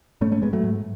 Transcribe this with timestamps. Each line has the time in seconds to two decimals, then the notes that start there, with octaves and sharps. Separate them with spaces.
0.21 G#2 A3 C#4
0.32 A3 C#4
0.42 G#2 G#3 B3
0.53 F#3 A3
0.64 G#2